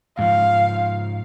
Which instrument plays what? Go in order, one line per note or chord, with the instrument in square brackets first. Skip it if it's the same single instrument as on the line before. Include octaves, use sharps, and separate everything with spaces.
[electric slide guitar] G#2 F3 [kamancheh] F5